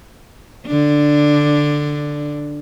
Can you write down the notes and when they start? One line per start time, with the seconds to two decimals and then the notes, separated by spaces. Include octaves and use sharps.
0.66 D3 D4